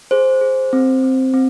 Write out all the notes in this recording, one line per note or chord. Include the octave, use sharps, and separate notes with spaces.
G#4 C5
G#4
C4
C4
C4